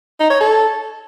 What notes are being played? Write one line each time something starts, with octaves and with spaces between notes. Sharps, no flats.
D#4
C#5
A4